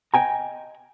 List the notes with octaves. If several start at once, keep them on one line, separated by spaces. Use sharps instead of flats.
D#5 G5 G#5 A#5